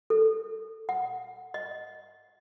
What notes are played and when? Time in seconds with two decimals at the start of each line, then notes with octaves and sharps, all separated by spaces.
0.10 A4
0.89 F#5
1.54 D#5